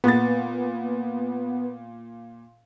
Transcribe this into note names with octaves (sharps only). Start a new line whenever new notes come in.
A#2 B3 A6